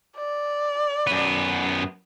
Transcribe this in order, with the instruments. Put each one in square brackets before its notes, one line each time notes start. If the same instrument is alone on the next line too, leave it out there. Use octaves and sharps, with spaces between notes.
[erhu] D5
[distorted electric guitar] F#2 B3